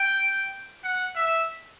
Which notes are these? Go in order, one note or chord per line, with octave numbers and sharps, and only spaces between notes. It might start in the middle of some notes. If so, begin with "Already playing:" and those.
Already playing: G5
F#5
E5